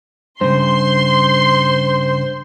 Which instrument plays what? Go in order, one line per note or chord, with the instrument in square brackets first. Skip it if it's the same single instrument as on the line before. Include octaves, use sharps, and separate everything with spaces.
[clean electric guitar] G2 C#3 [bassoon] C5 [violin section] C6